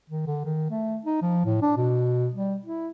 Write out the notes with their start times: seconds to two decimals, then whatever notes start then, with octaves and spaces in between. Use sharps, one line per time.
0.10 D#3
0.26 D3
0.45 D#3
0.70 A3
1.05 D#4
1.22 F3
1.45 A2
1.62 D4
1.77 B2
2.34 G3
2.66 E4